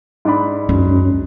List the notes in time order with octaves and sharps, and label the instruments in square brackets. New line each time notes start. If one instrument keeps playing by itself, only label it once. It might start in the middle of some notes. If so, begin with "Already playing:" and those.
[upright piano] G#2 D4 B5
[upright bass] C#2 C#4 [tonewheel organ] F#2